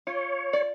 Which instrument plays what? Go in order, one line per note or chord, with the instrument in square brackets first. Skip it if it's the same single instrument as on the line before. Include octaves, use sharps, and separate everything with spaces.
[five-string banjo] F4 [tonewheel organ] C#5
[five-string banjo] D5